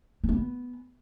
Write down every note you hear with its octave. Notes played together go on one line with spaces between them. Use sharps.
B3
A3
B3